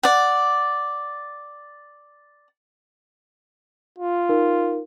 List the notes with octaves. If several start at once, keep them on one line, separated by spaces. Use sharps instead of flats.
D5 F#5
F4
D#4 A#4